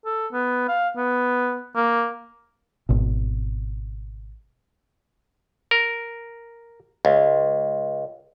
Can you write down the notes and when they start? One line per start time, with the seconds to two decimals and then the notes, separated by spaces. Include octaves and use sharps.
0.05 A4
0.33 B3
0.68 F5
0.97 B3
1.75 A#3
2.89 G#1 B2
5.71 A#4
7.05 C#2